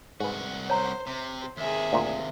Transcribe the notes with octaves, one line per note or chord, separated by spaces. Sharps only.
C2 G#2 F#4 B4
C5 C#5 A#5
C3 C5
D#2 C3 G#4 E5
D2 A#2 F5